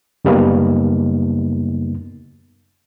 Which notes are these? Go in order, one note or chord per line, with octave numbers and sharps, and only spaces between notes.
F#2 C#3 G3 A#3 B3 D#4